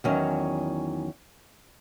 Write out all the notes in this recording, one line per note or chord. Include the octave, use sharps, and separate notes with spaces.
E2 D#3 F#3 C#4